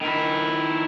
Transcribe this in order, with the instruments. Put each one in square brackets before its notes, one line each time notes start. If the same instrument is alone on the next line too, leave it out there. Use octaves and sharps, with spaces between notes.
[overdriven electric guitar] D#3 E4